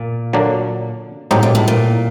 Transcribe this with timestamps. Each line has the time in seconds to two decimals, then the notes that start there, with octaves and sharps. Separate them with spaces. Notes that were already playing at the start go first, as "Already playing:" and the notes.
Already playing: A#2
0.33 D3 F#3 A#3 D4
1.31 A2 F#3 C4 D#4 G4
1.43 A#2
1.55 A2
1.68 A#2